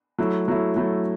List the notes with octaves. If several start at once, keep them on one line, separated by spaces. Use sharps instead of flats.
F#3 A3 E4
F#3 A3 E4
F#3 A3 E4